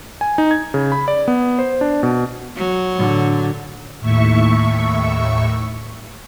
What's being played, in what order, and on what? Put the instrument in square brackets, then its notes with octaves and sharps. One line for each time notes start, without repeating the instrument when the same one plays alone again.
[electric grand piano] G#5
D#4
G#6
C#3
B5
D5
B3
C5
D4
B2
[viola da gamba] F#3
[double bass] A2 D3
[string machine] D#2 A2 E5 C#6